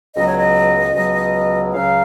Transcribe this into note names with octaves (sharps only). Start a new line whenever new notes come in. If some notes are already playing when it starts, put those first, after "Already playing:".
C#2 B2 F#3 D#5
C#5
D#5
C#2 B2 F#3
C#2 C#3 F#3 F5